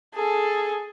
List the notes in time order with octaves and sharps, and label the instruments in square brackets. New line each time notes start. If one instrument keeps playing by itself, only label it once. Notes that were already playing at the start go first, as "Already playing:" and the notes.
[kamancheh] G#4 A4